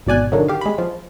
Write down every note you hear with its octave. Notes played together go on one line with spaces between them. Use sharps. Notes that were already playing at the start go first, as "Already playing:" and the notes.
G#1 B2 D5 G#5 F#6
D3 D#3 F#3
G4 F5
G#3 B5
F3